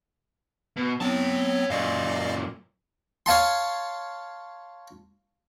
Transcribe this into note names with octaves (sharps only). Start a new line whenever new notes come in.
B2
F#3 B3 C4 C#5 A5
F#2 A#2 D5 D#5 F5
C#5 F5 A5 C6